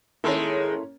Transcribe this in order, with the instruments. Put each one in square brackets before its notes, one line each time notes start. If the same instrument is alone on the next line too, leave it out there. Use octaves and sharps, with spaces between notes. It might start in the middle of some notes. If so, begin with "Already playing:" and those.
[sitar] D#3 G#3 [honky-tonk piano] A#3 C#4 [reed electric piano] E4 A4 C6